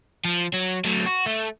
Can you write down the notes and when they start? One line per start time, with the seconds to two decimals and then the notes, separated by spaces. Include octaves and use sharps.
0.25 F3
0.54 F#3
0.85 A2 F#3
1.07 F#4
1.26 A3